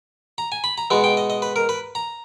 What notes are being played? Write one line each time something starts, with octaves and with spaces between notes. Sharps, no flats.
A#5
G#5
B5
A#5
B2 G#3 B3
G5
D#5
D#5
B4
A#4
B4
A#5